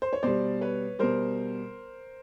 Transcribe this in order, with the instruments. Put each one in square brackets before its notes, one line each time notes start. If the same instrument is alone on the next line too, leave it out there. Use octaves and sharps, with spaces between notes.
[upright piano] C5
C#5
B2 G3 C5 D5
B4 C#5
B2 G3 A#4 C5